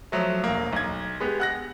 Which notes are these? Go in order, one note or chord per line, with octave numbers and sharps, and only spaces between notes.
F3 F#3 A3
E1 A#3
B1 G#6
G#3 B3 G4
F#5 F#6 A#6